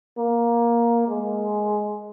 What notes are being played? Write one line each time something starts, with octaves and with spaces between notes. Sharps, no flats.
A#3
G#3